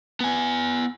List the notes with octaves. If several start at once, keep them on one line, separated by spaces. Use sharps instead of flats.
B3 G#5